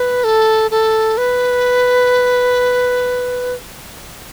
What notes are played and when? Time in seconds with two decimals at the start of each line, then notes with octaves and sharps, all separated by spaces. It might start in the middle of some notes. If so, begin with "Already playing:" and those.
Already playing: B4
0.24 A4
0.71 A4
1.17 B4